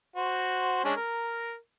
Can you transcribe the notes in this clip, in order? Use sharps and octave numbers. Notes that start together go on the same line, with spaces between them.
F#4 C5
G#3 C#4 D4
A#4